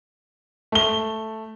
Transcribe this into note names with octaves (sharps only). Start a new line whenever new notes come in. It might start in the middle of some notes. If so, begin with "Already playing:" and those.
A3 G7